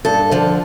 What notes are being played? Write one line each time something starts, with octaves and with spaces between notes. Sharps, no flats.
G2 A4
D3 F3